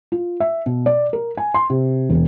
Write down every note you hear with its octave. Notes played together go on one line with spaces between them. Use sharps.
F4
E5
B2
D5
A#4
G#5
C6
C3
E1